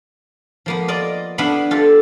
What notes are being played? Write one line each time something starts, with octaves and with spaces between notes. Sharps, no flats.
F3 A#3 B3
F4 D5 D#5
B3 D4 E4 F5 B5
F4 G4 A4